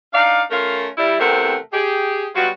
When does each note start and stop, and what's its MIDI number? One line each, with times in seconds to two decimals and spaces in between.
0.13 0.42 62
0.13 0.42 63
0.13 0.42 74
0.13 0.42 77
0.51 0.88 57
0.51 0.88 61
0.51 0.88 65
0.51 0.88 70
0.97 1.15 55
0.97 1.15 64
1.20 1.57 40
1.20 1.57 48
1.20 1.57 57
1.20 1.57 60
1.20 1.57 70
1.20 1.57 78
1.72 2.28 67
1.72 2.28 68
2.35 2.49 54
2.35 2.49 55
2.35 2.49 59
2.35 2.49 65
2.35 2.49 66